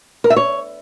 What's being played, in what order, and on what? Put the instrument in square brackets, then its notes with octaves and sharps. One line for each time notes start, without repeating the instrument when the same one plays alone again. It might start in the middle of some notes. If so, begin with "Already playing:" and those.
[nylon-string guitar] A#4
E5
C#5